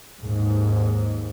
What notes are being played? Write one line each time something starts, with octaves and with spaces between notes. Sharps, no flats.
D#2 G#2